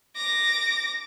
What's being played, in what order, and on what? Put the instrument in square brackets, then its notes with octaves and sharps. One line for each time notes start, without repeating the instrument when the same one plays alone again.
[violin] D6 A#6